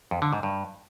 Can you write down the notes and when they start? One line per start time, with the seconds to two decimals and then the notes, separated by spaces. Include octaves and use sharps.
0.11 F2
0.22 D3
0.33 G#2
0.43 G2